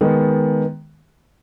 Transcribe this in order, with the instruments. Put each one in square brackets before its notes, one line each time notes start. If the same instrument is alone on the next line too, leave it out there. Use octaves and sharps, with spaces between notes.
[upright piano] D#3 G#3 B3